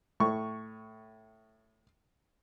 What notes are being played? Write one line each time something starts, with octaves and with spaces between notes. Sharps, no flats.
A2 C#6